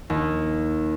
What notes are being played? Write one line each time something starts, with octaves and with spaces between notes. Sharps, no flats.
D#2